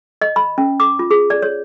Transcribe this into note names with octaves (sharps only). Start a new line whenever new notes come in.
D#5
B5
C#4
D6
F4
G#4
D5
C#5